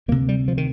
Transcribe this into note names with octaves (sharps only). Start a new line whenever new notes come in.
D2 C3 A#3
G3
F3
D#3